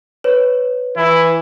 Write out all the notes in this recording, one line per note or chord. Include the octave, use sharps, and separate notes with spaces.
B4 C#5
E3 E4